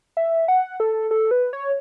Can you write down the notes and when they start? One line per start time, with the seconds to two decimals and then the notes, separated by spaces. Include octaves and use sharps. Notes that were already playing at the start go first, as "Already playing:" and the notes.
0.17 E5
0.48 F#5
0.80 A4
1.11 A4
1.31 B4
1.53 C#5